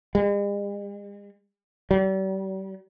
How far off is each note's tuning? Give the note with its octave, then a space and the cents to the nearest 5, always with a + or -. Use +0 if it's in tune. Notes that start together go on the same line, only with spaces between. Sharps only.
G#3 -45
G3 -40